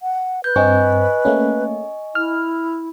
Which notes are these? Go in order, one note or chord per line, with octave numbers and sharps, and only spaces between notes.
F#5
B4 G6
G2 C4 D#5 G#5 C#6
A3 A#3 C#4
E4 F6